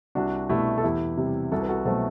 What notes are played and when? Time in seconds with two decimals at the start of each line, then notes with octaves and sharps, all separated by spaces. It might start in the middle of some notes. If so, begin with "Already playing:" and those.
0.15 C2 D4 F#4
0.49 B2 A3 E4 G4
0.78 A4
0.83 E2 E4 G4
1.17 C3 G3
1.51 C2 F#4 A4
1.62 B4
1.68 F#4 A4
1.85 B2 F#3 A3 A4 C5